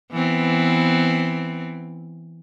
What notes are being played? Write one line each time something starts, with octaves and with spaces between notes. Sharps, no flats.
E3 B3 C4